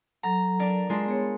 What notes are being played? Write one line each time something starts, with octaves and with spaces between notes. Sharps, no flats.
F#3 A4 F#5 A#5
D4 A#4 D5
G#3 D4 F4 D5
B3 G#4 C#5